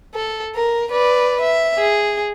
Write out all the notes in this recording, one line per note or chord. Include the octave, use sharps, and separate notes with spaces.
A4
A#4
B4 D5
E5
G#4